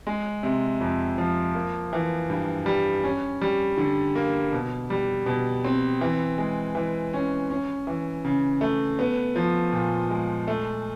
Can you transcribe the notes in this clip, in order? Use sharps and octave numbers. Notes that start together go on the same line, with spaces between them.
G#3
C3
F2
F3
A#3
E3
G2
G3
C#4
G3
D3
A#3
B2
G3
B2
C4
E3
G#3
E3
C#4
C#4
E3
C#3
A3
B3
F3
A#2
G#3
A3